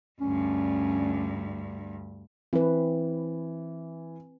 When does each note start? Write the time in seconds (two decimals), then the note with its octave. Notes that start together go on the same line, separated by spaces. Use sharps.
0.21 D2 G2 C#4
2.53 E3 C4 B4